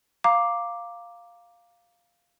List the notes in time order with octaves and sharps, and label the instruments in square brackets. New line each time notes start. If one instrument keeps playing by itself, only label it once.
[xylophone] F5 A#5 D6